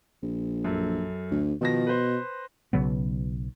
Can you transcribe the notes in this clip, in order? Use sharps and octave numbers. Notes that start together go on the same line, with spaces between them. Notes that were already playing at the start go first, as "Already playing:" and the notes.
A#1
F#2 A4
D2
B2 D#3 F3 A#6
B4 C5
B1 C#3 F#3 B3